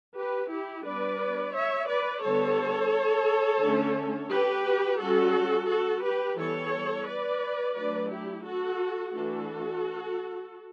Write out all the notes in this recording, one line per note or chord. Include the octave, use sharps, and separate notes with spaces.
G4 B4
E4 G4
G3 B3 D4 B4 D5
C#5 E5
B4 D5
D3 G3 B3 A4 C#5
D3 A3 C#4
G4 B4
G3 C#4 F#4 A4
F#4 A4
G4 B4
E3 G3 B3 A4 C#5
B4 D5
F#3 A3 D4 B4 D5
E4 G4
F#4 A4
E3 A3 D4 F#4 A4